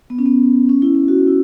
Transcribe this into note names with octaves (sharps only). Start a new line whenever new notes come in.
B3
C#4
B3
C#4
E4
C#4
F#4
E4